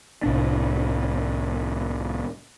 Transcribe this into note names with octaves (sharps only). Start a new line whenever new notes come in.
C2 A2 D4